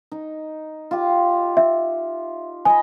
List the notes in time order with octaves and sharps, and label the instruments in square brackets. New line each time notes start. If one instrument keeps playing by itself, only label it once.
[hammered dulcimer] D#4
F4 G4
[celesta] E5
[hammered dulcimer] D#5 B5 [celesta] G#5